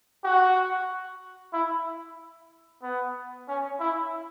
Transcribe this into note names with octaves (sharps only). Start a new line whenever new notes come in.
F#4
E4
B3
C#4
E4